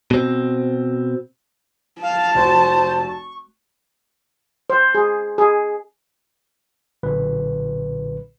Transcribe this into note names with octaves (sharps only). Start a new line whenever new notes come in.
B2 C4
F5 A5
F1 F#4 C5
C#6
C5
G#4
G#4
B1 A#2 D3 B4